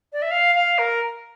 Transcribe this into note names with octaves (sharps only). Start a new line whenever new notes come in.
D5
E5
F5
F5
A#4